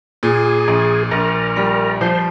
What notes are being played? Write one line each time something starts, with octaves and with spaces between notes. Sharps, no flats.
A#2 G#4
A#1
A#1 A#4
G3
F3 C5